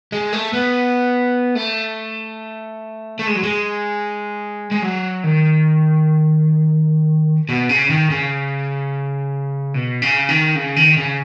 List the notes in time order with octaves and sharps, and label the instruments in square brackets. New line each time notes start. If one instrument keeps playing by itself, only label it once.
[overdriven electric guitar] G#3
A3
B3
A3
A3
G#3
F#3
G#3
G#3
F#3
D#3
B2
C#3
D#3
C#3
B2
C#3
D#3
C#3
D#3
C#3